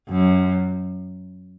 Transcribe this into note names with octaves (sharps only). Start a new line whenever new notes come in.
F#2